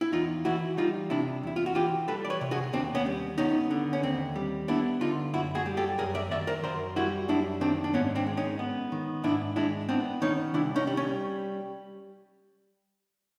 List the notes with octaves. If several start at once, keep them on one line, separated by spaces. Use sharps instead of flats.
E4
E2 D#4 F4
E3 E4 F#4
G3 D#4 F4
C3 D4 E4
E2 E4
F4
F#4
E3 F4 G4
G3 A4 B4
D5
B4 C#5
C3
F#4 G#4
D#2 C4 D4
B3 C#4
G3
B3 C#4 D#4
D3
C#4
D#2 C4
G3
B3 D4 E4
D3 D#4 F4
F#2 E4 F#4
F#4 G#4
G3
G4 A4
F#2 G#4 A#4
D5 E5
D#3 D5 E5
A#4 C5
F#2 A#4 C5
G3 E4 F#4
F#2 D4 E4
D#3 C4 D4
D4
G#2 B3 C#4
C4 D4
G#3
C#4 D#4
B3
D#3
G#2 D4 E4
G#3 D4 E4
B3 C4 D4
D#3 C#4 D#4
C2 D4 E4
C#4 D#4
G3
C#4